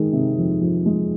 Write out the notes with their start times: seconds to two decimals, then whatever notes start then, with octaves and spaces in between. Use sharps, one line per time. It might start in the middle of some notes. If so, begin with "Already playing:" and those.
Already playing: D#3 G#3
0.13 C3
0.38 F2
0.61 F2
0.86 G#3